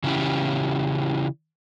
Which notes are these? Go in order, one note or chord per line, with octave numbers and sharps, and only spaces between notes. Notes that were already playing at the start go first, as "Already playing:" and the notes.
C#3 E3 C#4 E4 G4